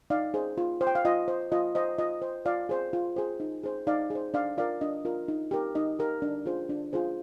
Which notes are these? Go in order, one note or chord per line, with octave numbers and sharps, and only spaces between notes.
D#4 D5 F5
G#4 C5
F4
C5
G5
F5
F4 D#5
C5
F4 D#5
C5 D#5
F4 D#5
C5
F4 D5 F5
G#4 C5
F4
G#4 C5
D#4
G#4 C5
D#4 D5 F5
G#4 C5
D4 D5 F5
F4 A#4 D5 F5
D4 D#5
F4 A#4
D#4
G4 A#4
D#4 D#5
G4 A#4
D4
F4 G#4 C5
D4
F4 G#4 C5